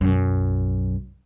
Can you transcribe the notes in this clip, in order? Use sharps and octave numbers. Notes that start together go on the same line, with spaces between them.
B1 F#2